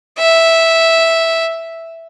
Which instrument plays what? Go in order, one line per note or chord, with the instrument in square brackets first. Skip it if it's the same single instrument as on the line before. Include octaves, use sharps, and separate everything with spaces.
[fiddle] E5